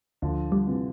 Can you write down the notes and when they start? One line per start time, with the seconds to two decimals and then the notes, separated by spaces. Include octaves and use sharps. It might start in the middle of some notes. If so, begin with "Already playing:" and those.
0.22 D2 D3 F3
0.52 G3
0.67 C3 E3